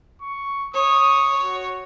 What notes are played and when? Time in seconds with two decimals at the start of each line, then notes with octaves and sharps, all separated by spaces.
0.21 C#6
0.74 C#5 D#6
1.42 F#4